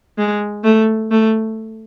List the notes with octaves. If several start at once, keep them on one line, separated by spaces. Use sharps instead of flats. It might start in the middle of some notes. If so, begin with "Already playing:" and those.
G#3
A3
A3